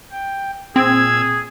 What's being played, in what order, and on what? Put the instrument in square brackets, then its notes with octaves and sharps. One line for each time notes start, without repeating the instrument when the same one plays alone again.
[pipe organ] G5
[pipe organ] A#2 E6 G#6 [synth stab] C4 [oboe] G#4